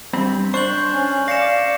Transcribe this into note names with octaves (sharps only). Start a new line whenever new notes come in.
G2 C4 B5
D4 C5 C#6 G6 F#7
C#4
D5 F5 A#6 C#7 E7